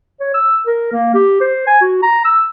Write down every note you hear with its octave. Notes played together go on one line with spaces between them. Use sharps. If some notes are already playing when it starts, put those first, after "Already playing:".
C#5
E6
A#4
A#3
G4
C5
G#5
F#4
A#5
E6